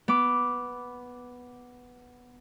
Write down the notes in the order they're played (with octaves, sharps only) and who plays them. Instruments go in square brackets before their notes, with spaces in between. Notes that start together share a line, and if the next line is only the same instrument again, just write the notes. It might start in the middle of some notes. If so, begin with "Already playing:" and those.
[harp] B3 D6